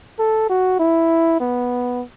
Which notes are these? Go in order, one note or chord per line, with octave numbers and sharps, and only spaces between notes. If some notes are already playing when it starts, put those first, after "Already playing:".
A4
F#4
E4
B3